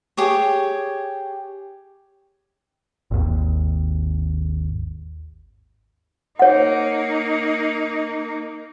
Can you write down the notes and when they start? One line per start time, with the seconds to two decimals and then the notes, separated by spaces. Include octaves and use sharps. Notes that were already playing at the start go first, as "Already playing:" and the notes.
0.17 G4 G#4 C#5
3.11 G#1 D#2
6.39 A#3 D#4 C#5 F#5